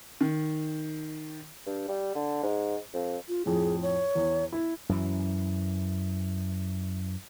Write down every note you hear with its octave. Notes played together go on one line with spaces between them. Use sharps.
D#3
G2
G3
D3
G#2
F2
F4
F2 A2 G#4
C#5
E2
E4
F#2 E3